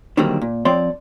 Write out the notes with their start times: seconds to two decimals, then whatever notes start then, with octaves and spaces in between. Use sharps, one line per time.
0.17 D3 D#3 F#3 G3 A#3 C4
0.41 A#2
0.65 F3 C4 C#5 D5 C6